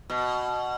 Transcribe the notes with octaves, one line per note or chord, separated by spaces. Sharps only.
B2